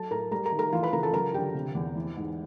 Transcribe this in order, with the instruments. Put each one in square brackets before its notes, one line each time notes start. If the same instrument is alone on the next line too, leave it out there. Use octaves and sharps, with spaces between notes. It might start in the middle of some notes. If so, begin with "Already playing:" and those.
Already playing: [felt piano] F#3 A4 A5
A2 A#4 A#5
G3 A#4 A#5
A#4 A#5
D#3
A#4 A#5
E3 F4 F5
B4 B5
C#3 A#4 A#5
A4 A5
F#3 A#4 A#5
D3 G4 G5
C3
E2
E3
G#2